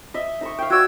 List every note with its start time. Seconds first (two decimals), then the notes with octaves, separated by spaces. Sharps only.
0.14 D#5 E5
0.41 D#4 E5 C#6
0.58 F5 G5
0.70 F#4 D5 E6 G#6